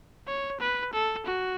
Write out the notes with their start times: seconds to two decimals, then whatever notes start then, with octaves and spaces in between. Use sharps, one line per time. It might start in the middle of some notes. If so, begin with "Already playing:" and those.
0.27 C#5
0.60 B4
0.93 A4
1.26 F#4